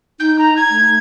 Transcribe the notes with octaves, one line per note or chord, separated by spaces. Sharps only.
D#4 G6
A#5
G#6
A3